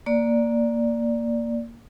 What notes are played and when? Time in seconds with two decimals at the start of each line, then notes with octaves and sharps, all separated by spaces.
0.06 A#3 D5